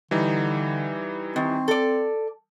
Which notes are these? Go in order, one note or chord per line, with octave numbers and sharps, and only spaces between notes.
D3 E3 G3 D#4
D#3 C4
A4 D5